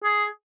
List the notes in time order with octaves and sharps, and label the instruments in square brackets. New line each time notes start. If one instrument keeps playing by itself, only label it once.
[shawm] G#4